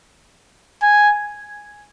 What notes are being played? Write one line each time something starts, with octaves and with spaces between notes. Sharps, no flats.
G#5